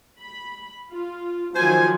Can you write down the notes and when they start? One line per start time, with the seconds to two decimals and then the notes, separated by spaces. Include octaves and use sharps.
0.22 B5
0.94 F4
1.56 D#3 F3 F#3 C5 G#5